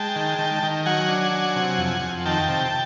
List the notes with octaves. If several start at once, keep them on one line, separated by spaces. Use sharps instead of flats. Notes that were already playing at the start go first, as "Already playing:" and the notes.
Already playing: G#3 G5 A5
D#3
D#3
D#3
F#3 F#5 G#5
D4
F#3
C3
F2
F2
D#3 G5 A5
C3